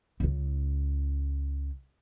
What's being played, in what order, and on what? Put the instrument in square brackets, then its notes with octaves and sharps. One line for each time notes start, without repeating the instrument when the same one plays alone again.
[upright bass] C#2 C#3